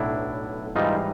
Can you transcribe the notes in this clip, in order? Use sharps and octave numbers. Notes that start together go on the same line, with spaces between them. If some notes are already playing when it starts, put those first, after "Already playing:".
Already playing: B1 A2 F#3 D4 E4
G#2 E3 G3 D#4 F4